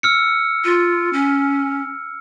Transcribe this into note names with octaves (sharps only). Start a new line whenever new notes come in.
E6 F6 C#7
F4
C#4